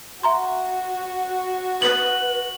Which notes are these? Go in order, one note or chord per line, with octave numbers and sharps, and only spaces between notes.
F#4 E5 A#5 C6
B4 F#7